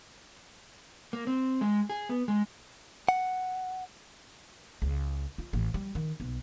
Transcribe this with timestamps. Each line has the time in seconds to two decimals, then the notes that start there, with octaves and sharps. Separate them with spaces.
1.13 A#3
1.27 C4
1.61 G#3
1.90 G#4
2.09 B3
2.28 G#3
3.09 F#5
4.82 C#2
5.38 F4
5.53 A1
5.74 G3
5.95 D#3
6.20 B1